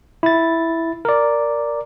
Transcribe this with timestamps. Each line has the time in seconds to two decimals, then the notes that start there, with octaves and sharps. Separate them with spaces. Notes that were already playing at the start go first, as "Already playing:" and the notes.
0.23 E4 A6
1.05 A#4 D5